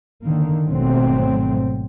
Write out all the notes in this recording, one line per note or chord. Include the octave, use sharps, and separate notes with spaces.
D3 D#3 A#3
G#1 B2 F#3 A3 C4